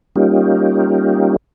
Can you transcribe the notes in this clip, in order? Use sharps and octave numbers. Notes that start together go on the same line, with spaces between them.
G3 A#3 C#4 D#4 F4 G4